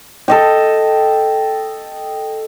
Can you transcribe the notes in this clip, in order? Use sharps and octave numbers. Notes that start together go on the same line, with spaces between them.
A4 D#5 G5